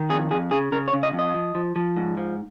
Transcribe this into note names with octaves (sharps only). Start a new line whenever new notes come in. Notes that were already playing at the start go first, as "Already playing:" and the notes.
Already playing: D#3
F2 G#4
F2 G#4
C#3 G#4
C#3 A#4
C#5
C#3
D#5
F2
D#5
F3
F3
F3
G#2
F3